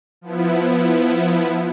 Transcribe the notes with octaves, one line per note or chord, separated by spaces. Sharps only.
F3 B3 E4